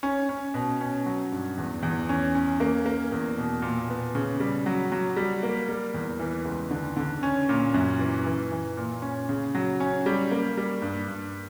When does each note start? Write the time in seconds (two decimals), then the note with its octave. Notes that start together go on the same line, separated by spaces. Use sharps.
0.03 C#4
0.29 C#4
0.54 B2
0.81 C#4
1.06 F#3
1.32 G2
1.58 E2
1.83 E2
2.09 C#4
2.35 C#4
2.60 A#3
2.86 A#3
3.12 E2
3.38 B2
3.62 A#2
3.89 B3
4.15 C#3
4.40 G3
4.66 F#3
4.92 F#3
5.16 G3
5.43 A#3
5.69 G3
5.94 E2
6.19 E3
6.45 C#2
6.71 D3
6.97 D3
7.23 C#4
7.49 A#2
7.74 F#2
7.99 E3
8.26 E3
8.52 E3
8.77 A#2
9.02 C#4
9.29 C#3
9.55 F#3
9.80 C#4
10.06 G3
10.31 A#3
10.57 G3
10.82 G2
11.08 G2